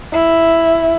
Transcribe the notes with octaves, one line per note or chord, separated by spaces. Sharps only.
E4